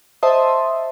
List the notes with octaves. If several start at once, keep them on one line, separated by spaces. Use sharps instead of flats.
C5 D#5 E5 A5 C6 D#6